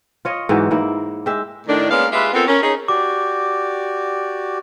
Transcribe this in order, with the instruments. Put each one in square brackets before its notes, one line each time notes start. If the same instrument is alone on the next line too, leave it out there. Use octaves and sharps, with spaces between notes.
[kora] F4 C#5 D#5
G#2 E3 F#3 G4
G#2 A#3 E4
G#3 G4 E5
[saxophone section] A2 D#3 D4
G#3 A#3 B3 C#4 D5 F5
G#3 F4 G4 B4 E5
B3 C4 F4 A4 A#4 C5
C#4 A#4
D#4 G#4 C#5
[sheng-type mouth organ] F#4 G4 D5 [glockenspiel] D6